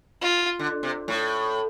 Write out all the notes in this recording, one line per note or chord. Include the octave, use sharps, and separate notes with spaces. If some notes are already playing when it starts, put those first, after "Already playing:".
F4
D3
C3
A2